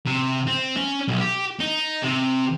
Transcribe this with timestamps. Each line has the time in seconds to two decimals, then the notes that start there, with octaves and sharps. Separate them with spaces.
0.06 C3
0.48 C4
0.77 C#4
1.08 B1
1.20 G4
1.60 D#4
2.03 C3